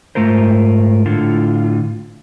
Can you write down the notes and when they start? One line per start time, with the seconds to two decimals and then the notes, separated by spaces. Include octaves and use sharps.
0.15 G#2 D#3 A3 F4 A#4 C5
1.06 A2 D3 F4